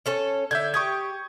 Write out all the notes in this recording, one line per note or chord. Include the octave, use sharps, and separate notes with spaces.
C#4 A4 C#5
D3 E5 G6 G#6
G4 C#6 D#6 G#6